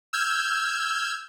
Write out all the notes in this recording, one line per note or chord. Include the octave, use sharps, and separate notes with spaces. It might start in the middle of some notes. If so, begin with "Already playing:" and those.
E6 F6 G6 G#6